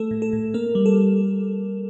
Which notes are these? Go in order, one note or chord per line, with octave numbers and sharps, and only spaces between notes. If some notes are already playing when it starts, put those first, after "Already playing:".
Already playing: A3 A4
A2
A4
A2
A#3 A#4
G3
A4